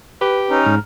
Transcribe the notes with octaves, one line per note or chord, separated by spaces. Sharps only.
G4 B4
C#4 D#4
G#2 A#5 F6